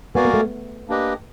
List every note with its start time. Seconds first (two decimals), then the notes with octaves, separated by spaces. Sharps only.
0.15 B3 F#4 A#4 D5 F5 G#5
0.25 A#3
0.34 A3
0.88 A#3 D4 G4 B4 D#5